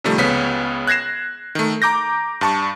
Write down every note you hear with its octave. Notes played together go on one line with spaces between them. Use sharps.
C3 D#3 F3 G3 A3
C#2 C#3 B3 C#5 B6
F#6 G#6 A#6 C7 E7
D#3 A3
A#5 D6 G6 A#6
G2 A5 C#6